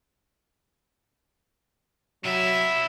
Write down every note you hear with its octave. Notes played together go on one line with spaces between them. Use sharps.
C3 F#3 E4 E5